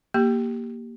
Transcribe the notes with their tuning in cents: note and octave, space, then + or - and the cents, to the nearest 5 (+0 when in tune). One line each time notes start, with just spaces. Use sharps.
A#3 +0 G4 +0